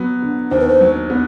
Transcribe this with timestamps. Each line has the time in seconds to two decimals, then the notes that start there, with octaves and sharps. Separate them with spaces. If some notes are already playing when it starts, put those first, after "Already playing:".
Already playing: F#3 B3
0.22 D3
0.51 D#2 C5
0.60 B4
0.68 C5
0.81 F#3
1.10 B3